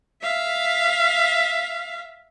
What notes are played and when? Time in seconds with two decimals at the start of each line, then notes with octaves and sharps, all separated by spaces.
0.22 E5 F5